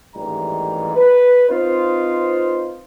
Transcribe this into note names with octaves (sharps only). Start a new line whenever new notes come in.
A1 D#2 G#2 E3 G3 A#5
B4
C4 D#4 F4 B4 C5